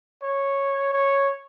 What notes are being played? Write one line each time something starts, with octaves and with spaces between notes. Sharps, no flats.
C#5
C#5